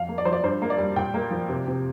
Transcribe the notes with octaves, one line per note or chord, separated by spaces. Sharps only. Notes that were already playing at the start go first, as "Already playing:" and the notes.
Already playing: F2 F5
A#3
D5
F3 C5
D5
G2 C5
A#3
D5
G3
A#2 G5
A#3
F3
C3
C3